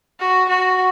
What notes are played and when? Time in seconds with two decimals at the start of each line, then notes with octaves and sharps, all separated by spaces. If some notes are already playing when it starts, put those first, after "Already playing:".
0.20 F#4
0.49 F#4